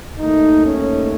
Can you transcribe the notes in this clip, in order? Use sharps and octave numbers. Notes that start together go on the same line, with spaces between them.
D#2 D#3 A3 D#4
C#4